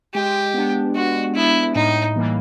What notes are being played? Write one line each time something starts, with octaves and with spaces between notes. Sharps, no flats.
G#3 G4
B3 D4
G#3 F#4
B3 D4 E4
A2 D#4
E3 G3 A#3